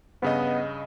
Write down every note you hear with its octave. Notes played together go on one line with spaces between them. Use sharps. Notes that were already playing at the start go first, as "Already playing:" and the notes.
G2 C#3 B3 D#5